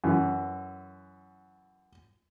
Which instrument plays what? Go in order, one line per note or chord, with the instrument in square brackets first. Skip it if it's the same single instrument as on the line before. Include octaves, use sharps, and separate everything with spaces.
[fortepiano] F#2 E3